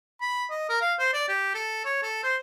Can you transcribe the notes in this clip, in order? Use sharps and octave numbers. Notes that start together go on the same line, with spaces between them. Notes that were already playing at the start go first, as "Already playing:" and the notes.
B5
D#5
A#4
F5
C5
D5
G4
A4
C#5
A4
C5